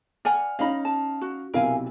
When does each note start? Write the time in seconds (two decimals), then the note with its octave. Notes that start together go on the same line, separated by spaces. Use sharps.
0.25 D5 F#5 G#5 F6
0.59 C#4 D#4 D#5 F5 B5
0.85 A5
1.21 F#4
1.54 B1 C3 E4 A#4 F5 G#5